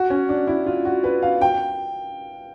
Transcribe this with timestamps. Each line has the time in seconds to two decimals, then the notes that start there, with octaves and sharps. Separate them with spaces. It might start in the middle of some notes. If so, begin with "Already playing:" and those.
Already playing: F#4
0.10 C#4
0.29 D4
0.48 E4
0.66 F4
0.85 F#4
1.04 B4
1.22 F5
1.41 G5